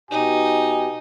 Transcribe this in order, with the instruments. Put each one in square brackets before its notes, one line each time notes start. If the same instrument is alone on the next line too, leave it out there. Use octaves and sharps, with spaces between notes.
[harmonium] B2 G4 [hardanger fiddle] D#4 [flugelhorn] G#5